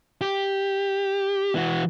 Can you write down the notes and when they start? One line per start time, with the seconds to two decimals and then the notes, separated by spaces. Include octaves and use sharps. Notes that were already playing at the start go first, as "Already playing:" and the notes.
0.21 G4
1.55 E3 F#4